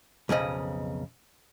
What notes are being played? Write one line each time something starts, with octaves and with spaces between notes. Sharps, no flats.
B1 F2 C#3 D#5